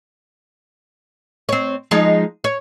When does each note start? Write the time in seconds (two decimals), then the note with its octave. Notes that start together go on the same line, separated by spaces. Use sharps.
1.49 C4 C#5
1.91 F3 G#3 D#4
2.44 C#5